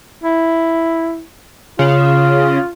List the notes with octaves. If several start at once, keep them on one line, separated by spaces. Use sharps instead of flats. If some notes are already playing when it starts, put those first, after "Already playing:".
E4
C#3 F4